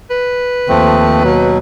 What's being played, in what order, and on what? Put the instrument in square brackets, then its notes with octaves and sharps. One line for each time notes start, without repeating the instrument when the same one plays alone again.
[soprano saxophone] B4
[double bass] D#2 [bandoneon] F3 A3 C4
[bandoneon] B2 F#3